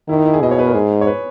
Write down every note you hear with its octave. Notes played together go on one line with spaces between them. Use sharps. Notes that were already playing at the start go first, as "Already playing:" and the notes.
D#3 E4
D#4
E4
G#4
B2 D#5
C#5
B4
A#4
G#2 G#4
C#5
B4